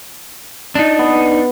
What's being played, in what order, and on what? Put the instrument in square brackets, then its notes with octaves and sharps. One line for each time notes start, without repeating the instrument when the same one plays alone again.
[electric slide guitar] D4 D#4
[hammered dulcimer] B3